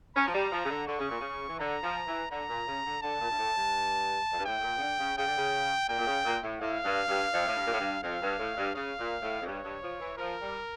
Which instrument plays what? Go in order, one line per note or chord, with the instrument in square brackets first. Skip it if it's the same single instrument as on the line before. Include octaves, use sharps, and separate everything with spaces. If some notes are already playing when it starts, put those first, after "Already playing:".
[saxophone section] C#4 [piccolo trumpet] A#5
[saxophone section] F3
G3
F3
C#3
D3
[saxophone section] D3 [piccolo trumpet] C#6
[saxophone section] C#3
A#2
C#3
E3
[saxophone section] D3 [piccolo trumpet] A#5
[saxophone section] F3
E3
[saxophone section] D3 [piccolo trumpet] A#5
[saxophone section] A#2
C#3
D3
[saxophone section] D3 [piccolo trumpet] A5
[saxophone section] A#2
G2
A2
G2
F2
G2
[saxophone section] A2 [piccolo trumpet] G5
[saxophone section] A2
A#2
C#3
D3
C#3
[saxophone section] C#3 [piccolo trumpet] G5
[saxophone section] D3
C#3
[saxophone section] A#2 [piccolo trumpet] G5
[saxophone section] A#2
C#3
A#2
A2
[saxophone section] A2 [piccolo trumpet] F5
[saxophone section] G2
G2
F2
A2
G2
A#2
A2
G2
[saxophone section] F2 [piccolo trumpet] F5
[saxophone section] G2
A2
G2
[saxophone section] C#3 [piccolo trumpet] F5
[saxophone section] A#2
A2
F2
[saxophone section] G2 [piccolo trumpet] C#5
[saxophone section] G2
F3
E3
[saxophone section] F3 [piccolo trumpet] A#4
[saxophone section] G3